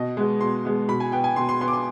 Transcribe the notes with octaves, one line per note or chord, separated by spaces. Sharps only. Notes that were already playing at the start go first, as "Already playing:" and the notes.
Already playing: B2 D#5
G#3 B3
B2 C6
G#3 B3
B2 B5
G#5
B3 G5
G#5
B2 C6
C6
B3 C6
D6
C6